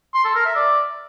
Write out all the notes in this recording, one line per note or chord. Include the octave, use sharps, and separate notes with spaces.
C6
A4
A#4
E5
D5